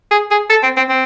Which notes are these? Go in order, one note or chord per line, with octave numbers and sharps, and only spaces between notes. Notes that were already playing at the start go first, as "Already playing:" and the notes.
G#4
G#4
A4
C4
C4
C4